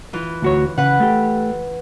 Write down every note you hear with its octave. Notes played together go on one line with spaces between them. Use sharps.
E3 F4
D2 F#4 C#5
C#3 B4 F#5
A3 G4